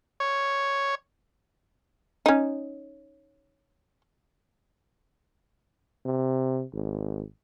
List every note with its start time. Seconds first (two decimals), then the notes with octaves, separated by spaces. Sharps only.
0.20 C#5
2.26 C#4 D#4
6.05 C3
6.73 G#1